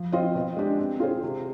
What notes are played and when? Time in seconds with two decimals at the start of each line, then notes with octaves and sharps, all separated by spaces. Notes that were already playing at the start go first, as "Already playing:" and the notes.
Already playing: F3
0.12 C4 F4 C5 D#5
0.35 B2
0.56 G#3 D4 G4
0.79 C4
1.00 F4 G#4 C5
1.23 C3